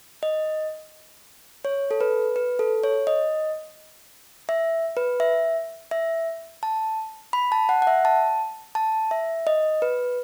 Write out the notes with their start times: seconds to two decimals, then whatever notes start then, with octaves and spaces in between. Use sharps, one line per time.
0.23 D#5
1.65 C#5
1.91 A4
2.01 B4
2.36 B4
2.59 A4
2.83 C#5
3.07 D#5
4.49 E5
4.97 B4
5.20 E5
5.91 E5
6.63 A5
7.33 B5
7.52 A5
7.69 F#5
7.82 F#5
7.87 E5
8.05 A5
8.75 A5
9.11 E5
9.47 D#5
9.82 B4